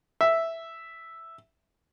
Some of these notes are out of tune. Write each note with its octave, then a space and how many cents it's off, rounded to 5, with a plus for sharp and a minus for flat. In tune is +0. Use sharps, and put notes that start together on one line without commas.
E5 +0